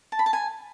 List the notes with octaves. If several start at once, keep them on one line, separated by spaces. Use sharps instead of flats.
A5
B5
A5
G#5